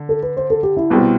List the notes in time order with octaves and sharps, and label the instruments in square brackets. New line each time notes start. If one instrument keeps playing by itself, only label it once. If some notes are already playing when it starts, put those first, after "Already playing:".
Already playing: [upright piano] D3
[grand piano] A4
B4
C5
A4
G4
E4
[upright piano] C2 B2 G3 C4